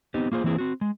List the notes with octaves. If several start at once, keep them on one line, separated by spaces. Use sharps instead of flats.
B3 C4 D#4 G4
A#3 F4 G#4 C5
E3 A#3 C4 E4 G#4
C4 F#4
G#3